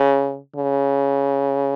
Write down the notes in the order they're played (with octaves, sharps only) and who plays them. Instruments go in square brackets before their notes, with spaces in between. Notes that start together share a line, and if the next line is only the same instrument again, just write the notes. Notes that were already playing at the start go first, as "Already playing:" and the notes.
Already playing: [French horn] C#3
C#3